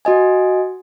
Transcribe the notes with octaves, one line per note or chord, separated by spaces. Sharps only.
F#4 D#5 G#5